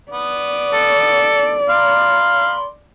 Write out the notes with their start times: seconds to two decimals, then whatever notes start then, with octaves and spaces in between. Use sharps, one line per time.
0.12 B3 D5
0.74 A4
1.69 A#4 F5 B5 C6